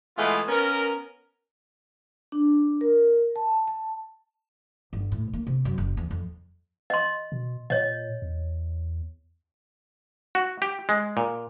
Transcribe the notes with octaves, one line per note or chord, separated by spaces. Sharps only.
E3 G#3 A3 B3 E4 F4
B3 C#4 A#4
D4
A#4
A5
A5
G1
A2
A#3
C3
F#2
F#1
E2
F2
D#5 C6
B2
A#2 C#5 D#5
E2
F#4
G4
G#3
A#2